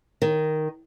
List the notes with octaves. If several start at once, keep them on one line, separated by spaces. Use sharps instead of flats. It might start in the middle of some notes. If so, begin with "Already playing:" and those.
D#3